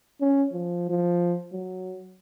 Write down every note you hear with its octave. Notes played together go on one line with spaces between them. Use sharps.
C#4
F3
F3
F#3